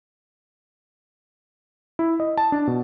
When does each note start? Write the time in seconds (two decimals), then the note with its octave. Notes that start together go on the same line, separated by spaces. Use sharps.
1.99 E4
2.20 D#5
2.38 A5
2.52 D4
2.67 B2